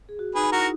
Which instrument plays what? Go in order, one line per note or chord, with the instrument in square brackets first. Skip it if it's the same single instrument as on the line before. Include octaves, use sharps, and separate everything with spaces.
[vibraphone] G#4
F#4
[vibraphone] D#4 [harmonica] G#4 B4
[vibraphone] E4 [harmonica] F#4 A#4